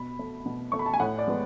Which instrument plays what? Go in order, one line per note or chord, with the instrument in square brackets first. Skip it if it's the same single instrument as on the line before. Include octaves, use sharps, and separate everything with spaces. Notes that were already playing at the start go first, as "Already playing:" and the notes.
Already playing: [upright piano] B2 B5
A3
B2
A3 C#6
B5
A5
G#5
A2 F#5
D5
G#3 B3